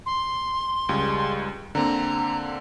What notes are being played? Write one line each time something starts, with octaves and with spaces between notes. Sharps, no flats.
C6
C#2 G3 G#3
D3 A#3 C4 A#5